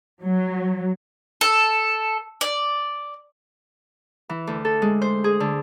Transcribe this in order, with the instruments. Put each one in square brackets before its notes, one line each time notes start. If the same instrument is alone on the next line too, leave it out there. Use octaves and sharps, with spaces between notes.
[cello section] F#3
[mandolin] A4
D5
[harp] E3
D2
A4
G#3
C5
G#4
D3